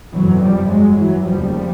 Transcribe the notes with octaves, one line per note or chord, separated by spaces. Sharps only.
G1 F2 C3 E3 F#3
F3 G3
F#3 G#3
E3 F#3
F1 D#2 C#3 F3 G3